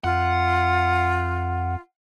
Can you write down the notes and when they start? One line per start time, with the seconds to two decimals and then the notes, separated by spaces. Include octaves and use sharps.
0.04 F2 F4 F#5